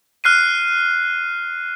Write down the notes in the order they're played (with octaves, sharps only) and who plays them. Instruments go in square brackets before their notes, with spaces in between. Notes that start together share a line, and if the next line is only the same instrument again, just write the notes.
[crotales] F6 F#6 C7 D#7